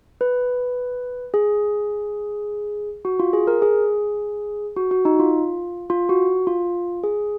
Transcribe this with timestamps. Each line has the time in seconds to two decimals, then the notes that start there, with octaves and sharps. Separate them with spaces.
0.21 B4
1.34 G#4
3.05 F#4
3.20 F4
3.33 G#4
3.47 A#4
3.62 G#4
4.76 F#4
4.91 F#4
5.05 D#4
5.20 F4
5.90 F4
6.09 F#4
6.47 F4
7.04 G#4